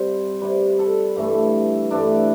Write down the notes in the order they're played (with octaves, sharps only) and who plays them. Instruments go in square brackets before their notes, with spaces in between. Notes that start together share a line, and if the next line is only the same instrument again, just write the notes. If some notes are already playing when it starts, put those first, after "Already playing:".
Already playing: [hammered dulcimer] C3 G3 C5
C3 G3 B4
A4
G2 E3 A3
G2 E3 A3 D4